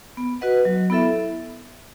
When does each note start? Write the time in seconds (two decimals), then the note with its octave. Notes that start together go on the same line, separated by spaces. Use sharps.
0.17 B3
0.41 F#4 B4 D#5 F#5
0.65 F#3
0.90 B3 E4 A4 E5